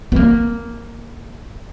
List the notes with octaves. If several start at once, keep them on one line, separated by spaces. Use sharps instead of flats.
B3
A#3